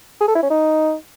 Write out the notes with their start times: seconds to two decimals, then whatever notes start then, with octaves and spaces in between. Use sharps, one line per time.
0.20 G#4
0.28 A4
0.35 E4
0.43 C#4
0.50 D#4